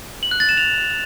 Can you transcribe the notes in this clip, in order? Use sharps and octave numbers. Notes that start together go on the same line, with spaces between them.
F#7
F#6
A6
E7
F7